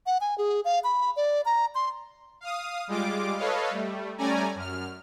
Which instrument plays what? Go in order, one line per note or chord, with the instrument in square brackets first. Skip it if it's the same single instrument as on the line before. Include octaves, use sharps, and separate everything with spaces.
[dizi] F#5
G#5
G#4
F5
B5
D5
A#5
C6
[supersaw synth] F5 D#6
G3 G#3 F4 D6
A4 B4 C#5 D#5 F5
G3 A3
G3 A3 C#4 D5 G#5 A#5
F#2 F6